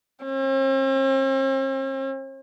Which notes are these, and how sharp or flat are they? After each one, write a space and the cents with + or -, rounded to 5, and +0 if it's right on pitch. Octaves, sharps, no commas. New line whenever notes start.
C4 +45